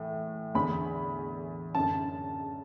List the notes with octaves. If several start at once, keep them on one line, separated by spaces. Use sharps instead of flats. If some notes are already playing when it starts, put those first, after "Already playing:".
Already playing: A2 E3
E2 D3 B5
F#2 D3 A5